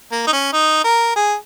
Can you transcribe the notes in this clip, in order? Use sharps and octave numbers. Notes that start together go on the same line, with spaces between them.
A#3
D#4
C#4
D#4
A#4
G#4